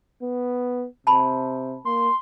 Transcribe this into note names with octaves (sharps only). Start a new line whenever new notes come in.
B3
C3 A5 B5
A#3 C6